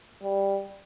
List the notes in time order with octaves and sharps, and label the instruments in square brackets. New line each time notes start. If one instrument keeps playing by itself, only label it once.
[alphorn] G3